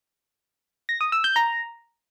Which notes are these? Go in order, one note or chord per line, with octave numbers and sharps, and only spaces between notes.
A#6
D#6
E6
G6
A#5